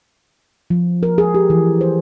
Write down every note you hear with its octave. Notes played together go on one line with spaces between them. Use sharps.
F3
A#4
G#4
G4
E3
C5